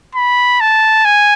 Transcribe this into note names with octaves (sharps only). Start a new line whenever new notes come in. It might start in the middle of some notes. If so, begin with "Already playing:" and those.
B5
A5
G#5